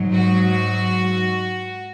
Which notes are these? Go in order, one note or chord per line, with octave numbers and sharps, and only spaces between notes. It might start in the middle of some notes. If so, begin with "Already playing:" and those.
Already playing: G#2 F#3
F#4